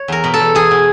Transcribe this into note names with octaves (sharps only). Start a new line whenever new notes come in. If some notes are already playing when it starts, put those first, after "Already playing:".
Already playing: C#5
E2 A#4
B2
A4
E2
E2 G#4
B2